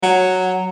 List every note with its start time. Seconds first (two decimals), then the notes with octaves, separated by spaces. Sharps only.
0.03 F#3